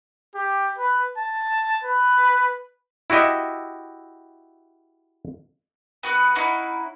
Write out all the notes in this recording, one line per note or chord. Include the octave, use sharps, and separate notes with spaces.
G4
B4
A5
B4
E4 F#4 G4 D#5 E5
B3 F#4 B4
C#4 D#4 E4 F#5